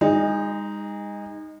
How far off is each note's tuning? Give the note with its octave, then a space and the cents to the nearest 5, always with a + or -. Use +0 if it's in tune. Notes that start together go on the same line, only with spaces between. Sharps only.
G#3 -35 D#4 +0